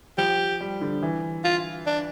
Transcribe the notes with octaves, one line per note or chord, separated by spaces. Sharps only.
F3 G4
G3
D3
E3
F4
D4